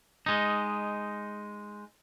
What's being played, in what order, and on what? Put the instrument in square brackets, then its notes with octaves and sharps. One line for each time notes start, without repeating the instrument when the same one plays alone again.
[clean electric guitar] G#3 D#4